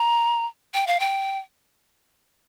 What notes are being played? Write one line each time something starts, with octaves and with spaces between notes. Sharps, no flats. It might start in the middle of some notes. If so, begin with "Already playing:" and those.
Already playing: A#5
G5
F5
G5